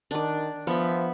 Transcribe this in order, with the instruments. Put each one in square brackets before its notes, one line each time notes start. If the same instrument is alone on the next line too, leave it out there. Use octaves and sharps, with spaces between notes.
[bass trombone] D#3 [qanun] D4 D5
[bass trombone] F3 [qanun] B3 E5